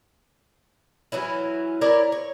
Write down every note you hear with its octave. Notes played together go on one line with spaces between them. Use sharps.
E3 F#3 C#4 E4
E4 A#4 C#5 D5
C#5